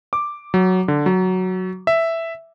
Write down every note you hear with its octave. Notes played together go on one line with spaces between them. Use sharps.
D6
F#3
D3
F#3
E5